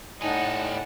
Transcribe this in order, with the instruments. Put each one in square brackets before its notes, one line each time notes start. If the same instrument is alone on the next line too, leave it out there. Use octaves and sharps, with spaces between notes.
[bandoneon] A2 [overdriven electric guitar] G3 G#5 [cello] D#4 [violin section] F#5 A5